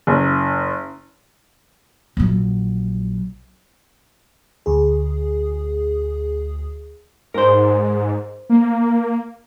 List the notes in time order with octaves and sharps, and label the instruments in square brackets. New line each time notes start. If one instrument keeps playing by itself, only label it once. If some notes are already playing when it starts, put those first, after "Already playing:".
[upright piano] F#1
[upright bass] A#1 F#3
[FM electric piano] D2 G#4
[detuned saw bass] G#2 [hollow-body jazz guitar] A#4 C5
[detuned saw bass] A#3